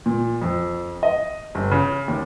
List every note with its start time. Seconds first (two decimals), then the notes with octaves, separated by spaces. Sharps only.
0.06 A#2
0.42 F2
1.03 D#5
1.55 G1
1.71 C#3
2.08 D#2